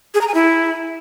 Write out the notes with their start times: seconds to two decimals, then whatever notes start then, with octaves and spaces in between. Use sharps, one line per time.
0.14 G#4
0.21 A#5
0.28 G#5
0.34 E4